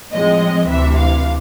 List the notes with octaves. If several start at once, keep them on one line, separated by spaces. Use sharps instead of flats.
A2 F3 G#3 C4 D#5
D2 C3 E3 E5
F5